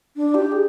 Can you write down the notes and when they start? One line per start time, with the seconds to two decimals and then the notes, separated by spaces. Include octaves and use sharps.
0.16 D4
0.35 G4
0.52 G#4